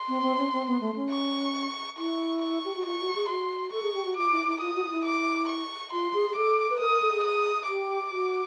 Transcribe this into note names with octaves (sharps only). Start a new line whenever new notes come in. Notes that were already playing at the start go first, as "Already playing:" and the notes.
Already playing: C6
C4
C4
C#4
C4
B3
A3
C#4
C#6
E4 C#6
C#6
G4
F#4
F4 C#6
F#4
G#4
F#4 C6
A4 C#6
G#4
G4
F#4
F4 D6
E4
E4
F4 D#6
F#4
F4
E4
D6
C#6
F4 C6
G#4
G#4
A4 D6
B4
A#4 D#6
A#4
A4
G#4
D#6
G4 D6
F#4